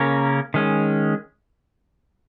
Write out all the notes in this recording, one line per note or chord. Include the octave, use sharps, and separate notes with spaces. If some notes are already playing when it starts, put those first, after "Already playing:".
Already playing: C#3 A#3 C#4 A#4 C#5
D#3 G#3 C#4